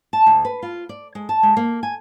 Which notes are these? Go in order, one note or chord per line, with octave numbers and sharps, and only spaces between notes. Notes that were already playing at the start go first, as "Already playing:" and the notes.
A5
D2
B4
F4
D5
G#3
A5
G#3
A#3
G#5